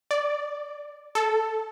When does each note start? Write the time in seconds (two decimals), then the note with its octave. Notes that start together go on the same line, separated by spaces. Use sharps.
0.11 D5
1.15 A4